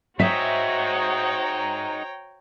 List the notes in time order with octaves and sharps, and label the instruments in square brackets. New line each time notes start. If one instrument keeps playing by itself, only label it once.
[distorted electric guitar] D#4 G#4 [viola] F#4 C5 [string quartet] C#5 G5 A#5 [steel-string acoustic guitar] E5